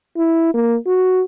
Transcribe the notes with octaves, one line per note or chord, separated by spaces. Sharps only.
E4
A#3
F#4